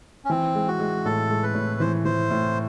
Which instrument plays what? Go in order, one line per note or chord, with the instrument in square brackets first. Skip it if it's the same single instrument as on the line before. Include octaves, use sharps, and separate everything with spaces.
[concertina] C#4
[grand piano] E3 [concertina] C4
[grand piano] G#3
[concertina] F#4
[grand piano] G#3
[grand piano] A2 [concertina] A4
[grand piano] G#3
[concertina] B4
[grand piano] A2
[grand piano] E3 [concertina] C5
[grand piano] E3 [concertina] C5
[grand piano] A2